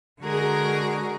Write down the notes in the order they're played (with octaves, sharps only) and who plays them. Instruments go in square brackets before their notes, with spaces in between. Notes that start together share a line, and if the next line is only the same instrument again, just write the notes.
[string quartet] D3 G#3 F#4 G#4 A#4 A#5